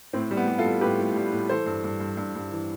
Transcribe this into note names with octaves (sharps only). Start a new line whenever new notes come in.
A2 C4
G3
B3
G3
F4 A4
G3
A2 G4 B4
A2
G3
A2
E3 A4 C5
G2
G2
G2
G2
G2
E3